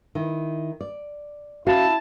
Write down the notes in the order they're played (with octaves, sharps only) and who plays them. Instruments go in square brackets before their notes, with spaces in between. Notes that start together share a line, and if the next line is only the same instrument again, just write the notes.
[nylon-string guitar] D#3 E4
D5
[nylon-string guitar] C#4 F#4 F5 [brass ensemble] E4 A5